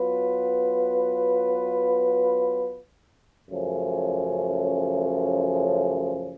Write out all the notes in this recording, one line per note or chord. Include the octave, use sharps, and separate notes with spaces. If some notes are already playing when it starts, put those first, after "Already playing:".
Already playing: F#3 B3 F4 B4
F#2 C#3 F3 A3 C#4